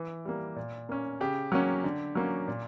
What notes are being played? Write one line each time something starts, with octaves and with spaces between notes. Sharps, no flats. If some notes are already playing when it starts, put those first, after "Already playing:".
Already playing: E3
G3 A#3
A#2
A#3 C#4
C#3 G4
F#3 A#3 C#4
D3
F#3 A#3 C#4
A#2